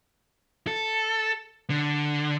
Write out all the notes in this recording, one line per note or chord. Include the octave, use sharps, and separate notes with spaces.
A4
D3